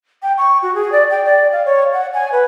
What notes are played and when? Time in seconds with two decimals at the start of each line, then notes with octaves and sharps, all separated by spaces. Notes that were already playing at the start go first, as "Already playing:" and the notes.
0.23 G5
0.38 C#6
0.62 F#4
0.75 G#4
0.92 D5
1.10 G5
1.25 D5
1.52 F5
1.66 C#5
1.93 F#5
2.14 G#5
2.32 B4